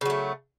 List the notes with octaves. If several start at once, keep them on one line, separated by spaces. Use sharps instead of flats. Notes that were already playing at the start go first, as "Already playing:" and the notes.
C#3 F#3 A3